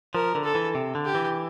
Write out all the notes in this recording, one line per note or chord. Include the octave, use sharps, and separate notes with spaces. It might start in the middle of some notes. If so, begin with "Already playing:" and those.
F3 A#4
D3
A4
E3
C3
D3
G4
E3